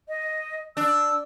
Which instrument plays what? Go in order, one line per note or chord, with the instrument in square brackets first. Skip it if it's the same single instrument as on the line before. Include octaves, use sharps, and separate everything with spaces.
[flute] D#5
[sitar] D4 [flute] E6